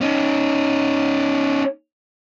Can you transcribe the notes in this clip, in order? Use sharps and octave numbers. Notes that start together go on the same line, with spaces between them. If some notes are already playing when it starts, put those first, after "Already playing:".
C#4 D#4